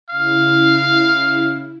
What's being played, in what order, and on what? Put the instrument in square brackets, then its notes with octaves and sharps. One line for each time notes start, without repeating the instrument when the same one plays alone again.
[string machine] C#3 E4 [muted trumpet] F5